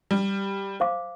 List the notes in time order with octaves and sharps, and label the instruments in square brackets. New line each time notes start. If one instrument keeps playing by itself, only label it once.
[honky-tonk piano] G3
[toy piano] C5 F5 D6